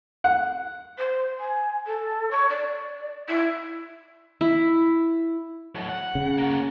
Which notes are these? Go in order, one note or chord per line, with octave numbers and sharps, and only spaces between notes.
F#5
C5
G#5
A4
C#5
D5
E4
E4
A2 F#3
F#5
C#3
A#3 F#4